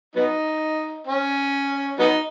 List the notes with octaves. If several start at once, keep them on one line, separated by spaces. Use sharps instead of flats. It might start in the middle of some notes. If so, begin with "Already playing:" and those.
F#3 B3 D#4
C#4
F#3 B3 D#4